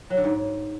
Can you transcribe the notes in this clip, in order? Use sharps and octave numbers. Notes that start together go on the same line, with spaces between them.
F#3
D3
G#2